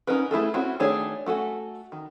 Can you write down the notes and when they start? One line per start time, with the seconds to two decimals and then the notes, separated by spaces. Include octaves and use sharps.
0.07 C#4 D#4 F#4 A#4 B4
0.31 A3 E4 G#4 A4
0.54 C4 C#4 E4 F#4
0.80 D#3 A3 D4 G#4 C#5
1.26 A3 F#4 A4 G#5
1.92 D#3